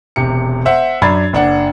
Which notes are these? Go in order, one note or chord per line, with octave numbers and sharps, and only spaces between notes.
E1 C3 C#7
C5 E5 F#5
F#2 D4 B5 G#6 A6
F#1 D4 F#5